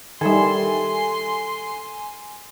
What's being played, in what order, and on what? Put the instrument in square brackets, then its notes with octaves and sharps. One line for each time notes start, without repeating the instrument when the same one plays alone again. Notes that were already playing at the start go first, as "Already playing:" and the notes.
[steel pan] D#3 G3 [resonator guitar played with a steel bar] A4 E5 [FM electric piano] G#5 [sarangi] C6